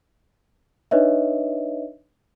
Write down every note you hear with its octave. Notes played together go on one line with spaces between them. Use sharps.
D4 D#4 B4 C#5 D#5 E5